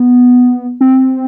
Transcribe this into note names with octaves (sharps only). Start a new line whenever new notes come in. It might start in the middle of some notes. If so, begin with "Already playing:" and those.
Already playing: B3
C4